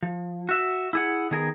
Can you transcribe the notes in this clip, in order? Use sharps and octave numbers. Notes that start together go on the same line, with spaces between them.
F3
F#4 E5
E4 G#4 F#5
D#3 B3 G#4 A#4